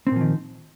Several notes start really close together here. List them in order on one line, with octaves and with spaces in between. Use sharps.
C4 A#2 F3 D#3